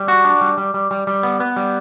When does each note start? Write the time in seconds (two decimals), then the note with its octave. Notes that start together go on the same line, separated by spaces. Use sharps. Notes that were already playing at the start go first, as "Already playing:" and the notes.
Already playing: G3
0.08 F#4
0.25 D4
0.41 G3
0.58 G3
0.74 G3
0.91 G3
1.07 G3
1.23 B3
1.40 B3
1.56 G3